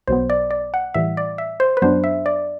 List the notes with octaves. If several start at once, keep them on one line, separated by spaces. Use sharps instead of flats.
B1 B2 F#3 B3 C5
D5
D5
F#5
A2 E3 G3 E5
D5
E5
C5
B4
F#2 F#3 B3 D4 C5
E5
D5